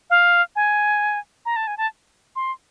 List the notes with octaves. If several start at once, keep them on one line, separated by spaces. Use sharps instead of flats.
F5
G#5
A#5
A5
G#5
A5
C6